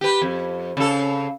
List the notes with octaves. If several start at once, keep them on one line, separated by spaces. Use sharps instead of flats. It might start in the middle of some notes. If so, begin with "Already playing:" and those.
G4 B4
F2
C#3 A4